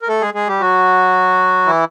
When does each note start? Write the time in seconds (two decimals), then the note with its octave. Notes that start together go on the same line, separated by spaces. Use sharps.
0.02 A#4
0.08 A3 A4
0.21 G#3 G#4
0.34 G#3 G#4
0.47 G3 G4
0.60 F#3 F#4
1.66 E3 E4